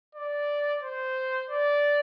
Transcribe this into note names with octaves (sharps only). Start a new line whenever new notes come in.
D5
C5
D5